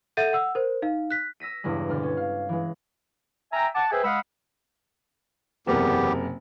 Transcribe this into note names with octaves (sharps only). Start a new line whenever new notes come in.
A4 E5 F#5 G6 A6 D#7
F#5 E6
A#4 C5
D#4 F5
F#6 B6
E6 A#6 B6 D#7
E2 G2 C#3 G#3
D2 B2 F6 A6
C#4
F5
E3 G#3
E5 G5 G#5 A#5
F#5 A5 D6
G#4 B4 C5 E5 G5 G#5
G#3 F5 F#5 B5 D#6 E6
F#1 E2 C3 B3 G4 A#4